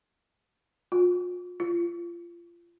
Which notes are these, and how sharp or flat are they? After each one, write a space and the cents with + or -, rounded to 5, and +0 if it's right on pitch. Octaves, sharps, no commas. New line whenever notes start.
F4 +40
F4 -25